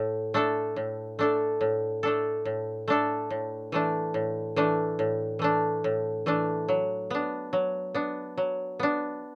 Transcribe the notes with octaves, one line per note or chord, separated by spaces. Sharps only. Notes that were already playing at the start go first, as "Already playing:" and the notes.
Already playing: A2
A3 D4 A4
A2
A3 D4 A4
A2
A3 D4 A4
A2
A3 D4 A4
A2
E3 A3 D4
A2
E3 A3 D4
A2
E3 A3 D4
A2
E3 A3 D4
F#3
B3 D4
F#3
B3 D4
F#3
B3 D4